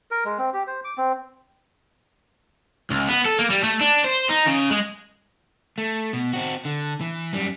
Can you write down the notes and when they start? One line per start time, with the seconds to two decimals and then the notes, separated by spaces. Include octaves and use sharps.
0.11 A#4
0.25 G#3
0.38 C4
0.54 G4
0.67 C5
0.84 D6
0.98 C4
2.90 C#2
3.09 B3
3.25 A4
3.39 A#3
3.50 G3
3.63 A3
3.81 D4
4.04 C5
4.29 D#4
4.46 C#3
4.71 G#3
5.78 A3
6.13 B2
6.33 C4 F#4
6.65 D3
7.01 E3
7.33 F#2 G3